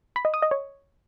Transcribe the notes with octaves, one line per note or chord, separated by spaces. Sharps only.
B5
D#5
D#6
D#5
C#5